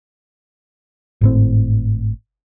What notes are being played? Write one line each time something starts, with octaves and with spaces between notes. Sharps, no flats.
G#1 A2 C4